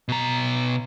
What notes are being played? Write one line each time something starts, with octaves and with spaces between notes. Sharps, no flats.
B2 A#5